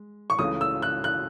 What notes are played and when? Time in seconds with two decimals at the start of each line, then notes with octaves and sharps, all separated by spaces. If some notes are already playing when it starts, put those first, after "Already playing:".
Already playing: G#3
0.30 C#6
0.39 C#2 C#3 E3 A3 D#6
0.61 E6
0.82 F#6
1.04 F#6